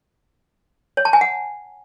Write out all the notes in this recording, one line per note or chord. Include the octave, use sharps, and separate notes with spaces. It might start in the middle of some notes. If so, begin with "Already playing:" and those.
C#5
A5
G#5
F#5